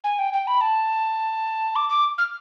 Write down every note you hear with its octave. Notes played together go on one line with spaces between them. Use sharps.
G#5
G5
G5
B5
A5
D6
D6
F6